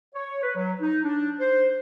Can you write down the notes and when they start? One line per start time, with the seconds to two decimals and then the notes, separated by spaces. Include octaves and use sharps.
0.15 C#5
0.43 B4
0.56 F#3
0.81 D#4
1.05 D4
1.40 C5